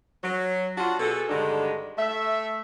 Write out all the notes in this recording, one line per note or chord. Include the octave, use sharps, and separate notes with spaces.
F#3
D4 F4 F#4
B2 G#4 A4
G2 D3 D#3 G#3 D4
A3 E5